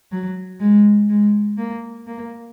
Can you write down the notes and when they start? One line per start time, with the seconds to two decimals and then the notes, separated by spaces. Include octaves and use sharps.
0.12 F#3
0.60 G#3
1.10 G#3
1.58 A#3
2.07 A#3